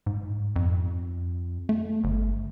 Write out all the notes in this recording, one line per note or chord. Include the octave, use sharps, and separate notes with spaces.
G#2
F2
A3
G1